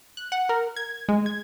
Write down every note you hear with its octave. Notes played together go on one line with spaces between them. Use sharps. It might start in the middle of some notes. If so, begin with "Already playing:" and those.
F#6
F#5
A#4
G#6
G#3
G#6